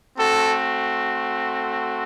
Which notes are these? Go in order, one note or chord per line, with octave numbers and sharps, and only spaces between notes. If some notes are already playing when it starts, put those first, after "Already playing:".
A3 C4 F#4 A4